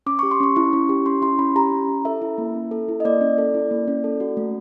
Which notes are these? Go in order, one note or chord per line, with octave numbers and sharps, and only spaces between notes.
C#4 D6
G4 C#6
C6
C#4 C#6
E4 C#6
C#4
G4
C#4 C6
E4 C6
C#4 B5
G4 A#5
C#4
E4
A4 E5
E4
A#3
C#4
A4
E4
D#5
A#3 D5
C#4
A4
E4
A#3
C#4
A4
F#4
A3